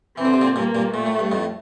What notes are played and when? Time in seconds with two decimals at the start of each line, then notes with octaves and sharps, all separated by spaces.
0.17 E3 C4
0.25 D3
0.33 C3
0.41 A#2 D3
0.56 G2 A#2 A#3
0.75 G2 A#2
0.94 A#2 A3
1.06 A2
1.19 G2
1.32 F2 A2